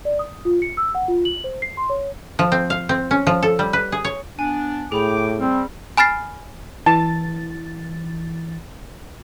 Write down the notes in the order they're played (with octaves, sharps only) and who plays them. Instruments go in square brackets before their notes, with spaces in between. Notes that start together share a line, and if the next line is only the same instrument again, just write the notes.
[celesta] D5
D#6
F4
C#7
E6
F#5
F4
F#7
C5
C7
C6
C#5
[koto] F3
C4
F5
C4
C#4
F3
A4
G3
B4
G#4
C#5
[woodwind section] B3 D4 [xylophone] G#5
[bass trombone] A2 [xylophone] G#4 B5 F7 [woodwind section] G5 D6
[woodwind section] G3 [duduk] C4
[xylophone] G#5 B5 F6 A6 C7
[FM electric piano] E3 A6 [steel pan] A5